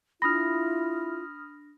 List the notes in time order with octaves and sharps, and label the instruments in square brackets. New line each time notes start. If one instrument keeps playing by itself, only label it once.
[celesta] D4 A#6 [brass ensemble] E4 [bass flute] F4 [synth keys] B5 D#6 F6